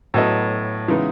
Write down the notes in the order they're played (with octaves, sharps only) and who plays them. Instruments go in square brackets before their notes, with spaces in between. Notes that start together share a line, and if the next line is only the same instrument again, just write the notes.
[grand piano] A2 [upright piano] F#3 B3 E4 A4 D#5
[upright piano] C#3 E3 G#3 B3 D#4